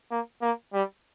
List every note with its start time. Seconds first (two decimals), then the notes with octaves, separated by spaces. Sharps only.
0.11 A#3
0.42 A#3
0.73 G3